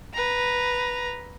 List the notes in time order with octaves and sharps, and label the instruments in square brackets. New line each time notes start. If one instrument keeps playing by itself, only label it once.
[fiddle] B4 A#5